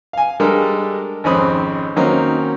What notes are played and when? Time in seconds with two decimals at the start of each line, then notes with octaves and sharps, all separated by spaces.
0.13 F5 G#5
0.40 G3 G#3 D4 A4 A#4
1.24 G#1 F2 C4 C#4 B5 D#6
1.96 D#3 F#3 A#3 C4 C#4 D#4